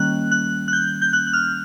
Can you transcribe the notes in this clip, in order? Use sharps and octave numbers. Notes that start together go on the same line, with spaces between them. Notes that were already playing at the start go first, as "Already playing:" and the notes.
Already playing: D#3 G3 A#3 C#4 F#6
F#6
F#6
G6
G6
F#6
F#6
F6